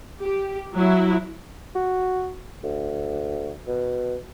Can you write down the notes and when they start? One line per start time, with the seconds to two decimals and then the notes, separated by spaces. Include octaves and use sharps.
0.21 G4
0.74 F#3 E4
1.75 F#4
2.63 D2
3.67 B2